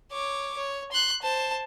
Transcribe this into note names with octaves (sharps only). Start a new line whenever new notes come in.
C#5 D6
C#5
C6 F#6
C5 A5